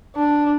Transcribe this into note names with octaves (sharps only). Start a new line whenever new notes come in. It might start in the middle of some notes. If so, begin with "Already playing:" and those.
D4